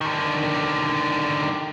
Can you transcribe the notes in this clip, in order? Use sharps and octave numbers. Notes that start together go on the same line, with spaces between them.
D3 D#3